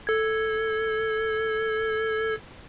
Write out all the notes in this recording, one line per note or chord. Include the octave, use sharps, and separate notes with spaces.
A4 G#6